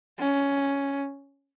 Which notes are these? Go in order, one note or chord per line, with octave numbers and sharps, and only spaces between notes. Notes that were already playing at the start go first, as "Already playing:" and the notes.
C#4